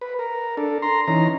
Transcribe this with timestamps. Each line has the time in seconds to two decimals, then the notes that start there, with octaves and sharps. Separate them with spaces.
0.01 B4
0.19 A#4
0.57 D4 A4
0.82 A#5 C6
1.08 E3 C#4 D#4 A#5